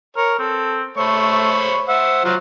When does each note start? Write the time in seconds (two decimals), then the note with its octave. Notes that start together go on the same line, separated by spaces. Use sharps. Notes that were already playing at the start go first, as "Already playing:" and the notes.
0.17 A#4 C#5
0.39 C4 A4
0.97 A3 C5 C#5 B5
1.88 C5 E5 F#5
2.25 F#3 F4 F#4 C5